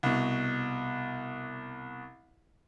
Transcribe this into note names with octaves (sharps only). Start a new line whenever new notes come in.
C2 B2